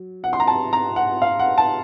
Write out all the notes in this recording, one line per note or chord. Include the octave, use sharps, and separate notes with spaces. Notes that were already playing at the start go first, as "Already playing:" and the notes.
Already playing: F#3
F#5
C6
A#5
A5
A#5
F#5
F5
F#5
A5